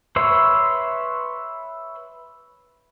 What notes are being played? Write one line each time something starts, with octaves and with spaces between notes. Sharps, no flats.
B4 C#5 E5 C6